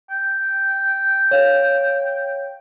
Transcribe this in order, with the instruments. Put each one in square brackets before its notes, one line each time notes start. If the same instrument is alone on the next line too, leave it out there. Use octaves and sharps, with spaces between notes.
[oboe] G5
[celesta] C#5 F5